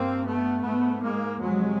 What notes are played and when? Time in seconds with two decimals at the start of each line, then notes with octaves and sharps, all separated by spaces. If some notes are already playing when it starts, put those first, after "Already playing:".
Already playing: G2 A#3 C4
0.25 A3 B3
0.64 G#2 A3 B3
1.02 G#3 A#3
1.40 F2 C3 F#3 G#3